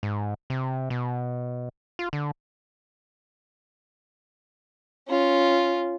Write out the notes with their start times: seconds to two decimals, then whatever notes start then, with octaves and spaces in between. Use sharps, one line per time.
0.03 G#2
0.50 C3
0.90 B2
1.99 F4
2.13 D3
5.09 C#4 F4